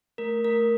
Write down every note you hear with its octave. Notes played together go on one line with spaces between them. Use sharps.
A3 A#4
A3 A#4